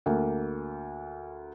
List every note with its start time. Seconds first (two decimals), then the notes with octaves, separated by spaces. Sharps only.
0.06 D2 A#3